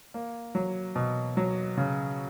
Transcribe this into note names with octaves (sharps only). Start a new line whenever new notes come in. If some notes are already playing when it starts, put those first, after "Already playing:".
A#3
F#3
B2
F#3
C#3